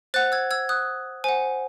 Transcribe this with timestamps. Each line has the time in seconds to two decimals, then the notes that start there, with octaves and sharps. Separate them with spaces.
0.14 C5 F#5 F#6 A6
0.32 E6 G#6
0.51 E6 G#6
0.69 D#6 F#6
1.24 C5 F#5 G#5